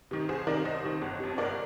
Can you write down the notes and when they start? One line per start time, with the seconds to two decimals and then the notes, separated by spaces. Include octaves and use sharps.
0.11 C3 D#3
0.29 C2 G#4 C5
0.47 C3 D#3 A#4 D5
0.65 C2 C5 D#5
0.84 C3 D#3
1.02 G1
1.20 F2 C3
1.38 G1 A#4 D5